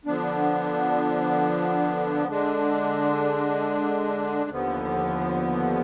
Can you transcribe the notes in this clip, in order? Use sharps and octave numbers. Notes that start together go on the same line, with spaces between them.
D3 F3 B3 D4
D3 G#3 D4
D#2 D3 F3 B3